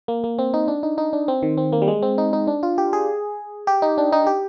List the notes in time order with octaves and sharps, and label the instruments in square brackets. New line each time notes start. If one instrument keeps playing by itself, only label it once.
[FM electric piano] A#3
A#3
C4
D#4
D4
D#4
D#4
D4
C4
D#3
C4
A#3
G3
G#3
C4
D#4
D#4
D4
F4
G4
G#4
G4
D#4
D4
D#4
G4